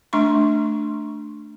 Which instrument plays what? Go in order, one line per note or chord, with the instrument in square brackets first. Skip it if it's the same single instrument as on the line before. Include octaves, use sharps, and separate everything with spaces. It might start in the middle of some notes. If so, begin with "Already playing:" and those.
[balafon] A3 D4 C6 C#6